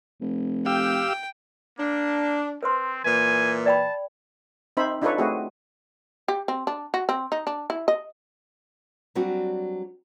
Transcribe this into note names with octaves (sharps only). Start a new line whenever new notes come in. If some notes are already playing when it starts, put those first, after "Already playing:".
F1
G4 F5 G5 E6
A#3 D4
C4 B4 C5 C6
A#2 E3 G#5
D5 G5 A5 B5
C4 D#4 C5 E5 B5
D4 D#4 F4 A4 B4 C#5
A3 C4 E4 F#4 G#4
G4
C4
D4
F#4
C4
D#4
D4
E4
D#5
F#3 G3 C4 D4 F#4